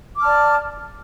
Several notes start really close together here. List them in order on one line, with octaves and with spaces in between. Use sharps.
D6 F6 A5 D5